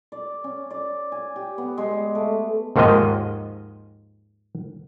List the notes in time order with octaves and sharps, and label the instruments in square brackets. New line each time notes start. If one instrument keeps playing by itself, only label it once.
[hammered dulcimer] D5
C#4
D5
G#5
G4
B3
G#3
D5
A3
[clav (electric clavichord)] D#2 G#2 D#3 F3 G#3 D#5